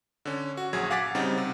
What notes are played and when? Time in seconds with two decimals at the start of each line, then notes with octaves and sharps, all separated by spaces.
0.25 D3 C#4
0.57 F#4
0.73 A#1 F#3 G#4 G#6
0.90 F5 F#5 G#5 D6 A6 B6
1.15 C#3 G3 C4 D#4
1.38 C3